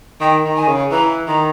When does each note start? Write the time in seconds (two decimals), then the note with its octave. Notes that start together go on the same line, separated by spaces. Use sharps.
0.21 D#3 G5
0.45 D#3
0.56 D#3 G#5
0.68 C#3
0.91 E3 A#5
1.27 D#3 A#5